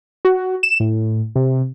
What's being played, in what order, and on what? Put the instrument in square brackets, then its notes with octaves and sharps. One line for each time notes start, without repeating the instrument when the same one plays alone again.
[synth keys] F#4
E7
A2
C3